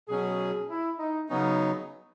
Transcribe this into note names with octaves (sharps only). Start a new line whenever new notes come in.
B2 F#3 C#4 G#4
E4
D#4
C#3 F#3 B3 C#4 D#4